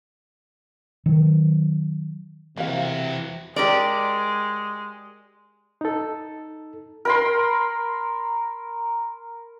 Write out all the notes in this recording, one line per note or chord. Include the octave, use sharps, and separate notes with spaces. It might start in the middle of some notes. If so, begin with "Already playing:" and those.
D#3 F#3
C3 E3 A#3 F#4 F5
G#3 G4 A#4 D5
D#4 A4
A#4 B5 C6